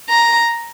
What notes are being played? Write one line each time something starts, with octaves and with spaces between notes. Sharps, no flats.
A#5